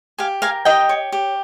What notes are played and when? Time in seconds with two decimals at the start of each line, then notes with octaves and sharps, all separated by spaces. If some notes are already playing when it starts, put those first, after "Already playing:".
0.18 G4 F5 G#5
0.42 A#4 F5 G#5
0.65 G4 D#5 G5
0.89 C#5
1.12 G4